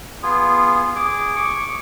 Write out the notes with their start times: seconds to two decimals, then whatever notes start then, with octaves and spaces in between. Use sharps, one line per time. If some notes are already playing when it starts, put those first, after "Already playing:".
0.23 B3 F4 G#4
0.96 G#4 D6
1.36 C#6 D6